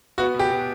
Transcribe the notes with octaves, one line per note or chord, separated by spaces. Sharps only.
B3 F#4
B2 G4
B2